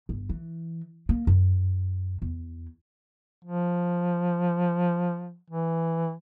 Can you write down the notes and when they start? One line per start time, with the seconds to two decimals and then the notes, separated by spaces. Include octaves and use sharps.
0.09 G1
0.29 E3
1.09 A#3
1.27 F#2
2.22 E2
3.45 F3
5.50 E3